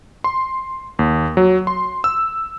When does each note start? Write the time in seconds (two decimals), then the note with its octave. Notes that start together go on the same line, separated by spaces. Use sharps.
0.24 C6
0.99 D#2
1.37 F#3
1.67 C6
2.04 E6